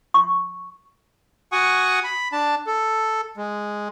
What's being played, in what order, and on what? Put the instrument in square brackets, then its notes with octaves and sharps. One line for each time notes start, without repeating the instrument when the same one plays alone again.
[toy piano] C#6
[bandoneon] F#4 F#5 G#5 C#6 D#6
B5
D4 A5
A4
G#3